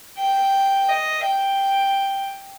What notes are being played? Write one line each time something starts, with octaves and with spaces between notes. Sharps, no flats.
G5
D#5
G5